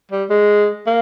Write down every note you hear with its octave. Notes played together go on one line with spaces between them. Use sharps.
G3
G#3
A#3